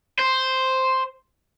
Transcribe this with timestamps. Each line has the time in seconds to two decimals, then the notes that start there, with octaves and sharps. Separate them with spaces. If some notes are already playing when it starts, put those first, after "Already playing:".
0.19 C5